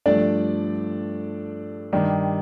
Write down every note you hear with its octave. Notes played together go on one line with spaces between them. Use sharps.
G2 F3 A3 D4 D5
G2 D#3 G3 D4